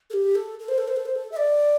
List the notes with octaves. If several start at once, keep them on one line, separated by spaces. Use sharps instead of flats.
A4
G4
A4
A4
C5
A4
C5
A4
C5
A4
E5
D5